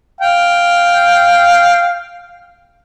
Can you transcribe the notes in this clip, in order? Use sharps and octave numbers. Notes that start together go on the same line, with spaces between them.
F5 G5